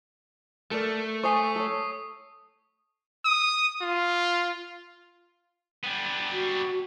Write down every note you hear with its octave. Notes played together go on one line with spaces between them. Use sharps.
A3 A4 A#4 D5
C5 G#5 C#6 D#6 C7
A4 C#5
D#6
F4
G3 B3
F#4